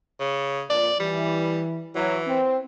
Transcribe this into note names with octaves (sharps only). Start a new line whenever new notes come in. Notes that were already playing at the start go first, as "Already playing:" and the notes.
C#3
F2 A#2 D5
E3 G3
E3 F#3
C4